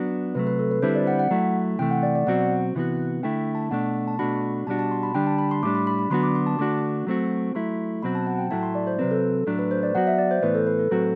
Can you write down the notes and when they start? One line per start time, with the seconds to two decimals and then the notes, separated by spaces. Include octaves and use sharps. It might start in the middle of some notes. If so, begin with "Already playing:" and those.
Already playing: F#3 B3 D4 F#4
0.35 C3 F#3 A3 B4
0.47 B4
0.59 A4
0.71 B4
0.82 D3 G3 C4 E4 C5
0.95 D5
1.07 F#5
1.19 F#5
1.31 F#3 A3 E4
1.79 C3 E3 A3 G5
1.91 F#5
2.03 D5
2.15 D5
2.27 B2 F#3 C4 F#4 F#5
2.75 C3 E3 B3 F#4
3.23 D3 A3 E4 G5
3.55 A5
3.71 B2 A3 D4 F#5
4.07 A5
4.19 B2 A3 D4 F#4 B5
4.67 B2 G3 D4 F#4 A5
4.79 A5
4.91 C6
5.03 B5
5.14 D3 G3 D4 G5
5.27 A5
5.38 B5
5.51 C6
5.63 A2 G3 D4 D6
5.75 B5
5.87 B5
5.99 B5
6.10 D3 F#3 B3 D4 F#4 C6
6.23 D6
6.35 C6
6.46 A5
6.59 D3 A3 D4 F#4 D6
7.07 F#3 A3 C4 F#4
7.55 F#3 A3 E4 C6
8.02 B2 F#3 C4 F#4 B5
8.15 A5
8.27 F#5
8.39 G5
8.51 A2 F#3 A3 E4 A5
8.63 C6
8.75 D5
8.87 C5
8.99 C3 F#3 C4 B4
9.11 A4
9.47 A2 F#3 A3 D4
9.59 B4
9.71 C5
9.83 D5
9.95 F#3 B3 F#4 F#5
10.07 E5
10.18 D5
10.31 C5
10.42 A2 E3 B3 B4
10.55 A4
10.67 B4
10.79 A4
10.91 A2 F#3 C4 F#4